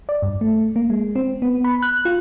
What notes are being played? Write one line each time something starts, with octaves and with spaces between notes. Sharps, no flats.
D5
G2
A3
A#3
G#3
C4
B3
B5
F#6
F4